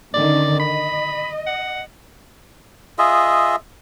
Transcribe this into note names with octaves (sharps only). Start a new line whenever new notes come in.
D3 D#3 C#4 D5
D#5 B5
F#5
F4 G#4 D#5 E5